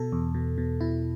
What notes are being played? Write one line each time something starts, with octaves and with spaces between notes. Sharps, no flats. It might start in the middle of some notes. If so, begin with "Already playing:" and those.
Already playing: B2 A4
E2
B2
B2
B2 E4